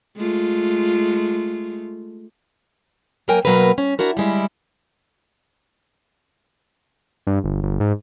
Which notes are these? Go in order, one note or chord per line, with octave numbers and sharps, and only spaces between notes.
G#3 A3 F4
F#3 A#3 A#4 G5 G#5
B2 D#3 F#3 A#3 A#4 B4
C#4
D4 E4 F#4 A#4
G3 G#3 E4
G2
G1
G1
G#2